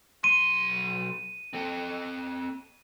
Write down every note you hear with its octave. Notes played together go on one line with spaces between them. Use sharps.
B1 C6 D#7
C4 A4